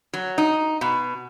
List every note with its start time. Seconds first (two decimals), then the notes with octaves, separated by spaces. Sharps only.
0.13 F#3
0.38 D#4
0.81 B2